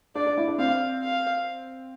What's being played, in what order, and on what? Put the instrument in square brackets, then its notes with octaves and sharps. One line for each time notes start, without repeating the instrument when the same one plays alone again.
[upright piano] D4 [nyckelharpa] D5
[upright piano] D4
E4
D4
[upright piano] C4 [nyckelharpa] F5
[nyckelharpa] F5